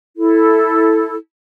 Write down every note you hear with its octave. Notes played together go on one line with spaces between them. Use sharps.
E4 A4